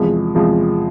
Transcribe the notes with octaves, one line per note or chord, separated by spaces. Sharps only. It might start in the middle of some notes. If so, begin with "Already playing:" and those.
Already playing: E2 C3 F3 G#3
E2 C3 F3 G#3